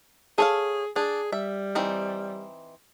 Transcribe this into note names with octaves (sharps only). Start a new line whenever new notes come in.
G#4 A4 C#5 F5
D4 G#4
G3 E5
E3 C4 D#4